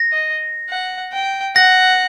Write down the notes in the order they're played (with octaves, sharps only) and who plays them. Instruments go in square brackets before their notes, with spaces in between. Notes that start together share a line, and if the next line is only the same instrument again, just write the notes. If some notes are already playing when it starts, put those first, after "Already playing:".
Already playing: [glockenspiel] A#6
[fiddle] D#5
F#5
G5
[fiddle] F#5 [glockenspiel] A#6